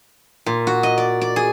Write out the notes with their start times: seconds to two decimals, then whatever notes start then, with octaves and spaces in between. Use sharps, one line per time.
0.46 A#2
0.67 F#4
0.83 D#5
0.98 D5
1.21 D5
1.36 G#4